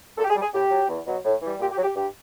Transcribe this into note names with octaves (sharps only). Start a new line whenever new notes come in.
A#2 A4
G4
G#4
G3
G#4
A2 G4
F#3
E2
B2 F#3
A2
E3 G3
A#2 G4
G4
F#3
G4
G2 G4